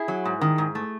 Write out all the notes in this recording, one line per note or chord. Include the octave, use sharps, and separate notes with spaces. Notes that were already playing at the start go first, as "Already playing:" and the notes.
Already playing: E4 G#4
F#3
G#2
D#3
G#2
A3